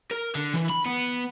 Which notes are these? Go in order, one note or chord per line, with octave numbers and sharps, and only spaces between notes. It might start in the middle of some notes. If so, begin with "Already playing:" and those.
A#4
D3
E3
B5
B3